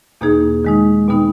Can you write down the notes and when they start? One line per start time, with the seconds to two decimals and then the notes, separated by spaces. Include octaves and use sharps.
0.21 E2 B2 A#3 D#4 G#4
0.65 D#3 G#3 D#4
1.08 B2 G3 B3 D#4